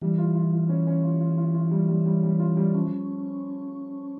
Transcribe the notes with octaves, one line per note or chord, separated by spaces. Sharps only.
E3 G3
F4
F4
F4
C#4
C#4
F4
F4
F4
F4
G3
G3
G3
G3
F4
G3
F3 C#4